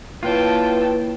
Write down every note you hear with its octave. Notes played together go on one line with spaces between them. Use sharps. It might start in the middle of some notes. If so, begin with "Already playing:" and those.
A#3 E4 F4 B4 C#5 G5 A5